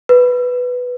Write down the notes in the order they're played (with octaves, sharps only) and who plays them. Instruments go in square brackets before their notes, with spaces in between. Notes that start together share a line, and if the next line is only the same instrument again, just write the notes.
[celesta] B4